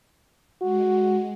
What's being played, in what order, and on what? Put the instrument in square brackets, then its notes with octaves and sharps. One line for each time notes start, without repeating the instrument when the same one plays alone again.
[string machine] G#3 [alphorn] F#4